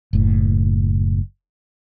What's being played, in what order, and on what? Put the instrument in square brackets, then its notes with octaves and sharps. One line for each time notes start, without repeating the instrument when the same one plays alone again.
[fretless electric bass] F#1 A2